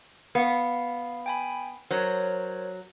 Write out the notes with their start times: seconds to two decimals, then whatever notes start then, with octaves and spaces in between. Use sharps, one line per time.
0.35 B3 F5
1.26 G5 G#5 B5
1.91 F#3 A#4 C5 C#5